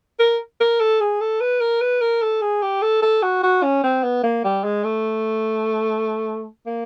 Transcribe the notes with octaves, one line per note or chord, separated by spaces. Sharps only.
A#4
A#4
A4
G#4
A4
B4
A#4
B4
A#4
A4
G#4
G4
A4
A4
F#4
F#4
C#4
C4
B3
A#3
G3
G#3
A3
A#3